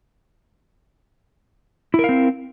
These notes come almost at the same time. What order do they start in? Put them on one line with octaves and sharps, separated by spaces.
E4 A#4 F5 C4